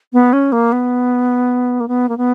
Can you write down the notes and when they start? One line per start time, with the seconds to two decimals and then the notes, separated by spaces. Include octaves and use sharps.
0.13 B3
0.33 C#4
0.52 A#3
0.72 B3
1.80 A#3
1.88 B3
2.09 A#3
2.17 B3